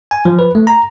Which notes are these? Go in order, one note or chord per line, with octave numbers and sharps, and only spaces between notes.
G#5
F3
B4
A3
A#5